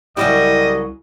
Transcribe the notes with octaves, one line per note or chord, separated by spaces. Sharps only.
C2 C#3 F#3 G3 E4 D#5